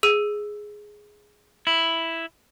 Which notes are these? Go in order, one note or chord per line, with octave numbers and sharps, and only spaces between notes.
G#4 E6 D#7
E4